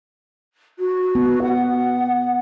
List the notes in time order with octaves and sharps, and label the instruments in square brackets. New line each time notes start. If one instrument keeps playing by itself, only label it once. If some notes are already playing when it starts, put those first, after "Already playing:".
[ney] F#4
[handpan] B3
[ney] F#5